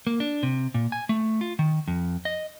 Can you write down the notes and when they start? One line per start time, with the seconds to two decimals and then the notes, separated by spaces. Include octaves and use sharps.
0.07 A#3
0.20 D4
0.43 C3
0.74 A#2
0.92 G#5
1.09 A3
1.41 F4
1.59 D#3
1.88 F2
2.25 D#5